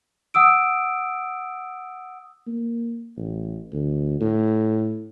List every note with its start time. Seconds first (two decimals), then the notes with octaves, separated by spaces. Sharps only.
0.34 F#5 D#6 E6 D7
2.47 A#3
3.17 A1
3.72 D2
4.20 A2